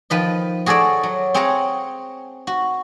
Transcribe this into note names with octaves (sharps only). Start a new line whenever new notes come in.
D#3 F3 B4 D#5
F#4 G#4 A4 C#5 D5
F#3
C4 G#4 C#5 F5 F#5 A#5
F#4